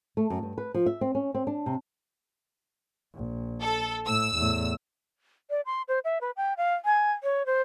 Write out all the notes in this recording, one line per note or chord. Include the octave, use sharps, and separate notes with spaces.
A3
F#2
G2
B4
F3
E5
C4
C#4
C4
D4
C3
A#1
A4
A2 E6
E2 A2
D5
C6
C5
E5
B4
G5
F5
G#5
C#5
C5